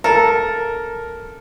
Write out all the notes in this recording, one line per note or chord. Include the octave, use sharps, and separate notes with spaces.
A4 A#4